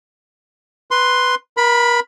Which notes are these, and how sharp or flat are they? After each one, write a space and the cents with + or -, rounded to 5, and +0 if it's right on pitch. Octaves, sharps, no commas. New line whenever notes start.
B4 +0 C6 +0
A#4 +35 B5 +0